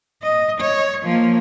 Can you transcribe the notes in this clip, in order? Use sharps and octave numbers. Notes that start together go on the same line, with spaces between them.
D#5
C#5
F3 A#3